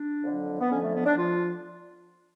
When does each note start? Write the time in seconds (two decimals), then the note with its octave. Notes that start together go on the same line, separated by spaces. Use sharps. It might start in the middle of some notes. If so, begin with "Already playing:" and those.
Already playing: D4
0.24 F2 D3 F#3
0.60 B3
0.70 F2 D3 F3 C#4
0.82 A3
0.94 B3
1.06 D4
1.17 F3 F4